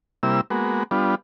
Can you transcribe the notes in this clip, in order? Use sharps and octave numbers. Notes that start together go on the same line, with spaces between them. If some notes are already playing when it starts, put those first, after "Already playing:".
C3 G3 A#3 E4 E6
G#3 A#3 B3 F#4
G3 B3 D4 F4